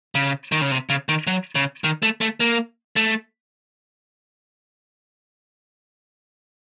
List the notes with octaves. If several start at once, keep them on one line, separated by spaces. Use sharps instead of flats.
C#3
D#3
C#3
C3
C#3
D#3
F#3
C#3
D#3
A3
A3
A#3
A3